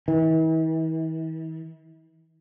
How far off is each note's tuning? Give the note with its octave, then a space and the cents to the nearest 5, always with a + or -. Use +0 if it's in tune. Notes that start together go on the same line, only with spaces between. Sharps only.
E3 -45